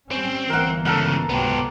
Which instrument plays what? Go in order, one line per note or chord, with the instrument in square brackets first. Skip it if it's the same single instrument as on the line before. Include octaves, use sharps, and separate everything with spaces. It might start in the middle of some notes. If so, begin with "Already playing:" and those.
[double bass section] G3 C#4 [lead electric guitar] C4
[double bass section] G1 E3 A#3 [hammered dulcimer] A#4 F#5
[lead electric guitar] C#2 C#3 [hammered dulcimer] A4 A#4 F#5
[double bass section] C#2 C3 F#3 [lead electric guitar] B3 G4